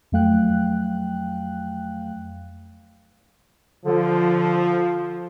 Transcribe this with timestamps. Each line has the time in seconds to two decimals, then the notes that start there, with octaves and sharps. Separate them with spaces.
0.12 F2 F#3 A3 F5 G5 F#6
3.86 D3 F3